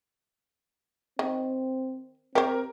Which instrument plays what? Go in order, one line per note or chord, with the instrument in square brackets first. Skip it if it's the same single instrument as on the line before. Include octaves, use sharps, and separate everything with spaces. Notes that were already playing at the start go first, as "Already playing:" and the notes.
[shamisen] D#3 [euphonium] C4
[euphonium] C4 [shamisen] G4 C5 [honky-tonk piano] A#4